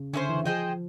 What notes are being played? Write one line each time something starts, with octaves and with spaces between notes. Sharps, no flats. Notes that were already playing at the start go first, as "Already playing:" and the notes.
Already playing: C#3
D3 C#4 E4 A4 C5
E3
F3 G#4 C5 D#5 G5